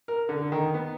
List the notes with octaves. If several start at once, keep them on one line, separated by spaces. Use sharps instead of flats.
A#4
D3
D#3
B3